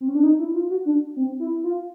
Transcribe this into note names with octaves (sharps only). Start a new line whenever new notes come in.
C4
C#4
D4
D#4
E4
F4
F#4
D4
C4
E4
F4